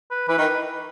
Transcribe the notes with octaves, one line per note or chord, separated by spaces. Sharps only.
B4
E3 B4
D#3